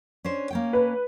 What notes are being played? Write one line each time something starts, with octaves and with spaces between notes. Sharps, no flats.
C#4 D4 C5
A#3 C#4 G5
B4